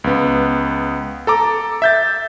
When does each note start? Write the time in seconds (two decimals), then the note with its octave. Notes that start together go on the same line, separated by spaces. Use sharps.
0.04 C#2 B3
1.27 A4 A#5 D6
1.82 E5 G6 A6